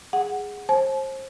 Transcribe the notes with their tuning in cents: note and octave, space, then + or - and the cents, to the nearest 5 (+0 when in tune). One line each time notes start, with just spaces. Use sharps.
G#4 -10 F#5 +0
C5 +30 A5 -45